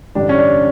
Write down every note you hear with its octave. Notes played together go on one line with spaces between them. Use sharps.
A1 G2 D3 G3 D4
C#4
D4